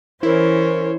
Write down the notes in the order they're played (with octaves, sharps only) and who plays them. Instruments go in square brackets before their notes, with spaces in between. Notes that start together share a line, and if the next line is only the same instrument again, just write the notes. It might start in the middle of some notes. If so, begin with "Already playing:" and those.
[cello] E3 C#4 [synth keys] E4 [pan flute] A#4 [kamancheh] C5 C#5